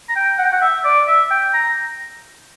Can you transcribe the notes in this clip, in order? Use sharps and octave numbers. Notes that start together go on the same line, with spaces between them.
A#5
G5
F#5
G5
F#5
E5
D5
E5
G5
A#5